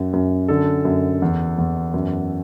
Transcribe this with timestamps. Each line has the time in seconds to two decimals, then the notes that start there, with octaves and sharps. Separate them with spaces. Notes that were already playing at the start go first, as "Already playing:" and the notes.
Already playing: F#2
0.13 F#2
0.48 D3 A4
0.85 F#2
1.22 E2
1.58 E2
1.94 F#2